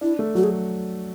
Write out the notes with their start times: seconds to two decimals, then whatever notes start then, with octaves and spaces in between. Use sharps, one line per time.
0.01 D4 E4
0.19 A3
0.35 F#3 F#4
0.43 G#4